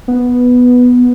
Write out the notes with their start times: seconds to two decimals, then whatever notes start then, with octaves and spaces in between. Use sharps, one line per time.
0.08 B3